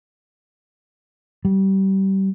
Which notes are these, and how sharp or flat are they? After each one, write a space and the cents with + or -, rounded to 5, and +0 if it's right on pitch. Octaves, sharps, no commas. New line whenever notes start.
G3 -25